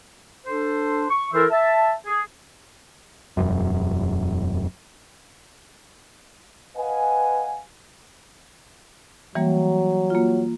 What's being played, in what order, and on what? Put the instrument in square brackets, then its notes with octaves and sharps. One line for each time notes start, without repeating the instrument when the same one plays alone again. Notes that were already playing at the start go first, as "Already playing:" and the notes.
[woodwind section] D4 A4 C5
C#6
E3 E4 A4 A#4 C5 E5
E5 A5
G#4
[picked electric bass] E1 F#2
[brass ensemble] B4 D#5 F5 F#5 G#5
[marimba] E3 G3 A#3 [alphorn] F#3
[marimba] A#3 F4